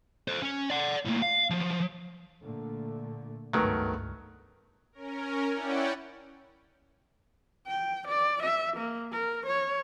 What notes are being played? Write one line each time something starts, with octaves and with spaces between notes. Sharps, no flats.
A4 C5
C#4
D5 F#5
A2 A#3
F5
F3 F#3
A#2 D3 A3
G#1 C#2 G2 D#3 F#3 A3 B3 A#4
C#4 A#4
C#4 E4 D5 F#5 G5
G5
D5
E5
A#3
A#4
C#5